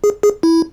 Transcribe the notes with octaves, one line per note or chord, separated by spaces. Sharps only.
G#4
G#4
E4